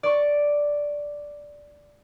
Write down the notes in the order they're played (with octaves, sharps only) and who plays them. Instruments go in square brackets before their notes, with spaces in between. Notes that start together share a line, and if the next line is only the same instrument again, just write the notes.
[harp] D5 C#6